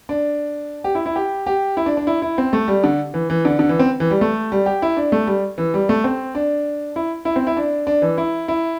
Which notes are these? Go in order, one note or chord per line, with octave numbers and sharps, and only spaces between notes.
D4
G4
E4
E4
G4
G4
E4
D4
D4
E4
E4
C4
A3
G3
D3
E3
E3
D3
D3
E3
C4
E3
G3
A3
G3
G4
E4
D4
A3
G3
E3
G3
A3
C4
D4
E4
E4
C4
E4
D4
D4
E3
E4
E4